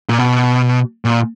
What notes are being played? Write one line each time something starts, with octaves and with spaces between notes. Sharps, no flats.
A#2
B2
A#2